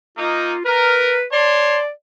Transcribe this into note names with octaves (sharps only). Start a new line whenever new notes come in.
A#3 D#4 F4
A#4 B4
C#5 D5 A5 C6